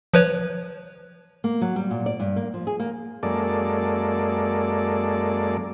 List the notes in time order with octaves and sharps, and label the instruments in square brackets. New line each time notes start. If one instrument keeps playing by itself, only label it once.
[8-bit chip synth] F3 B4 C#5
[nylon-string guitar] A#3
F#3
G3
A#2
D5
G2
A#3
F3
G#4
A#3
[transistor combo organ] F#2 G#3 A#3 A4 D5